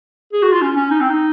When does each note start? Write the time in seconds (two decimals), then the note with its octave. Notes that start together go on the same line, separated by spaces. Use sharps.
0.33 G#4
0.42 F#4
0.52 F4
0.62 C#4
0.76 C#4
0.91 D#4
1.00 C4
1.10 D#4